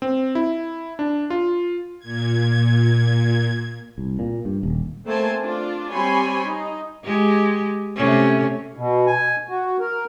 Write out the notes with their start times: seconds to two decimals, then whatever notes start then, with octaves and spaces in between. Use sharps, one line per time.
0.02 C4
0.35 E4
0.99 D4
1.30 F4
1.99 A#2 G#6
3.98 C2
4.19 A#2
4.45 G2
4.63 D#1
5.06 A3 A#3 C4 C5 G#5 A5
5.41 D4 F4 D5
5.91 G3 C4 C#5 G#5 B5 C6
6.46 D#4
7.03 G#3 G4
7.95 C3 A3 C#4
8.77 B2
9.07 G#5
9.49 F#4
9.80 A#4